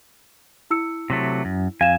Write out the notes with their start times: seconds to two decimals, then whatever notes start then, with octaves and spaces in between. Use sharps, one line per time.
0.71 E4 E6 C#7
1.10 C3 F#3 A3
1.45 F#2
1.81 F2 F5 G#5 E7